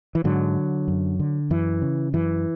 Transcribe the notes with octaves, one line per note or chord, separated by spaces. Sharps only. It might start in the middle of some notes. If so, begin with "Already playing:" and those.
E3
G#2 D3 F#3
F#2
D3
F#2 E3
C#3
F#2 E3